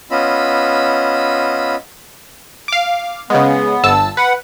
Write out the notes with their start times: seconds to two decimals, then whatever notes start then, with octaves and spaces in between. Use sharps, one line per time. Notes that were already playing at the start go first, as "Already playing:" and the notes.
0.11 B3 C#4 F4 D#5 B5 E6
2.68 F5 D6
3.30 C#3 G#3 B3
3.84 G1 A5 E6
4.17 B4 F#5